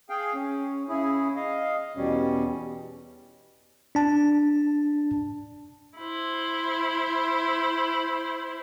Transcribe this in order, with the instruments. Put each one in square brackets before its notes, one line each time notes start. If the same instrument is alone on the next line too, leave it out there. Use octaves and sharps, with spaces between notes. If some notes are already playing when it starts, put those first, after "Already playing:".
[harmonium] G#4 F5 G5
C#4
C#3 C#4 E4 G#4
D#5 F5
E2 B2 G3 C#4
[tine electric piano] D4 A5
[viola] E4 C5